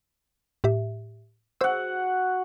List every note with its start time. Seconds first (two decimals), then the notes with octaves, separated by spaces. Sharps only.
0.64 A2 G4 E5
1.61 F#4 C5 F#5 E6